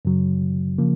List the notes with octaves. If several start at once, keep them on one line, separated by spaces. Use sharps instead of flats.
F#2 C#3 F#3
C#3 F3 A#3